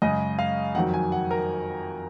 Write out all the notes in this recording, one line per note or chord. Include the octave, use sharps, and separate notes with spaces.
F#2 C#3 G#3 D#5
F5
F2 D#3 F#3 F#5
G#5
F#5
A#4